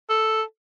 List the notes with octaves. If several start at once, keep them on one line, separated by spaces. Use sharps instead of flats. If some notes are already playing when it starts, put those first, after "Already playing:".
A4